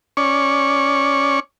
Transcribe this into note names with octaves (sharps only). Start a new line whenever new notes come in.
C#4 D5 C#6